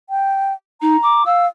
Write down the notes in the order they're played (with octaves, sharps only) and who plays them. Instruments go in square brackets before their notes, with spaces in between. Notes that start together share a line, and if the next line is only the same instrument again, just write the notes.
[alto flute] G5
[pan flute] D#4 [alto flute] A#5
[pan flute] D6
[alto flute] F5 [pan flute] E6